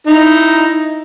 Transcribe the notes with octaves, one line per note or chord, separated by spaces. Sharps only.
D#4 E4